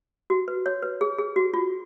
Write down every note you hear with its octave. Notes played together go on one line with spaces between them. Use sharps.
F#4
B4
C#5
B4
G#4
G#4
F#4
F4